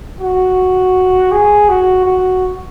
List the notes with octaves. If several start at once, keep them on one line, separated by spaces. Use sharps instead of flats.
F#4
G#4
F#4
F#4